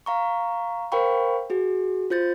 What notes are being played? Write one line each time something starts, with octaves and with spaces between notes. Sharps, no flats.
F5 A#5 C#6
A#4 C5 F5 G5 B5 C#6
F#4 G#4
F4 C5 G6 A6